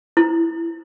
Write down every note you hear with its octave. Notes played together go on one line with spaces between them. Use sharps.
E4